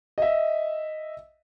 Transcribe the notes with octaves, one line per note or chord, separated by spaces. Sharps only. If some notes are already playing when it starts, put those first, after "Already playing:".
D#5 E5